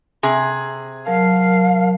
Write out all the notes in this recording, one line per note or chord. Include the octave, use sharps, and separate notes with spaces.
C3 G#4
F#3 A#4 F5 A5